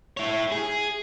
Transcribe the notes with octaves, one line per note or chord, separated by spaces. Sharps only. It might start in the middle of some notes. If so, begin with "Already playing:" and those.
E4 C#5
G#4